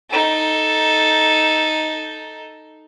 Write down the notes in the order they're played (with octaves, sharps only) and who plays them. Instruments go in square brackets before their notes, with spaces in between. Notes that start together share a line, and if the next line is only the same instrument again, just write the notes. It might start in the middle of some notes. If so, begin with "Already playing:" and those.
[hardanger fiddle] D#4 A4